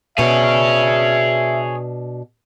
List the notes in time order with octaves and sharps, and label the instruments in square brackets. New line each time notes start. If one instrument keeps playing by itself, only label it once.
[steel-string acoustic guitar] B2 D4 [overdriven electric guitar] G#4 C#5 [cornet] E5